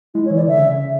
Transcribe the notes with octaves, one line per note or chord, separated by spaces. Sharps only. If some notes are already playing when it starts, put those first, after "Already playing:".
G#3 E4
C#5
E3
D5
D3 E5
C#3
C#3